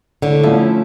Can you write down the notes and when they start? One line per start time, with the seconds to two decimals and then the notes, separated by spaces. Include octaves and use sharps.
0.22 A2 D3
0.43 F3 A3 C#4 E4